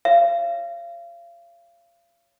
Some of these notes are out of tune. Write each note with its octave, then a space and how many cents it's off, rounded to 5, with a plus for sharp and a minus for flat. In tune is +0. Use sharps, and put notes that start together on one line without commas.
C#5 +0 F5 -35